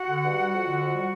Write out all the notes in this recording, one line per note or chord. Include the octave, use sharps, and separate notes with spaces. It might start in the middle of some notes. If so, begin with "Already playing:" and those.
Already playing: F#4 F#5
D3
G2
G3
F2
D3
F2
G3